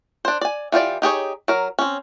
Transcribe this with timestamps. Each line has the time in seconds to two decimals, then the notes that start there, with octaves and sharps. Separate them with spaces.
0.25 D4 C5
0.41 D5 G#5
0.72 E3 F4 G4 D5
1.02 D#4 G4 G#4 C#5
1.48 F#3 A#4
1.79 C4 C#4